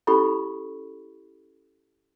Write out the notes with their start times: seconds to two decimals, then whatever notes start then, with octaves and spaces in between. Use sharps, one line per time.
0.07 C#4 E4 G4 A4 B5 C#6